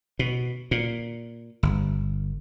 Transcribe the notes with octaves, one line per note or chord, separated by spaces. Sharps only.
B2
A#2
G1